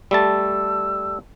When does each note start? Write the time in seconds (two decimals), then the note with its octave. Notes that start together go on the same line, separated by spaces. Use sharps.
0.11 G3 A3 A5 E6